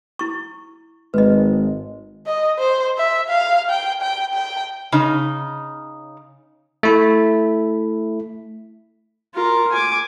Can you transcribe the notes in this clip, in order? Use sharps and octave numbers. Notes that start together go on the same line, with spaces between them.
E4 C#6
G#1 G#3 B4 D#5
D#5
C5
E5
F5
G5
G5
G5
C#3 D#4
A3 E4
F4 A#4
G#5 D6